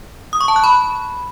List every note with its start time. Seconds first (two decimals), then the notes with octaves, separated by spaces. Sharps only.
0.33 D#6
0.41 C#6
0.48 A5
0.56 F#6
0.64 B5